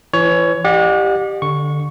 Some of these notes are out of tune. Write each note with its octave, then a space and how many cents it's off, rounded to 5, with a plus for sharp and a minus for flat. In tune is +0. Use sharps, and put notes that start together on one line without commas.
E3 +35 C#5 +20
G4 +0 D#5 -45 F#5 -40
D3 +0 C#6 +0